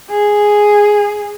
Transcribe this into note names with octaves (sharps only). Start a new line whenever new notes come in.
G#4